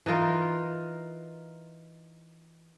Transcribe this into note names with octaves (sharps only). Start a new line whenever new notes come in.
E3 D#4 F4 A#4